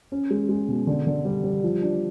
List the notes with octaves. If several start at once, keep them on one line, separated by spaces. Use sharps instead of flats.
C#4
G#3
G#3
B2
D3
D3
G3
G3
F3
D4